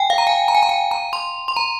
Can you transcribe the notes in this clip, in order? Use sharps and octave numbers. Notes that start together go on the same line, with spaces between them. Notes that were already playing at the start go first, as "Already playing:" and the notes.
Already playing: G5 G#5
F5
A#5
G#5
A#5
G#5
A#5
G#5
A#5
C6
C6
A#5